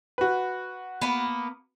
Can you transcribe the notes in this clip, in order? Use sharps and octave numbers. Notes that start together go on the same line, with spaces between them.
F#4 B4
A#3 B3